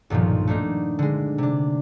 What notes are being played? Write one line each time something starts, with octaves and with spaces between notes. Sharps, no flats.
B1 G2 A#2 D#3 F3
A3 A#3 D4 D#4
D3 G#3
C3 D4